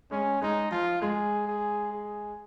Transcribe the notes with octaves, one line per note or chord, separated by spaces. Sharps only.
G#3 C#4
G#3 D#4
F3 F4
G#3 G#4
G#4
G#4